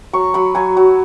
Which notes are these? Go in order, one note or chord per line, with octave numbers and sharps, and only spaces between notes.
F#3 C#6
F#3 B5
F#3 G#5
F#3